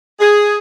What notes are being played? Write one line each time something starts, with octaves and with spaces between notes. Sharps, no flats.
G#4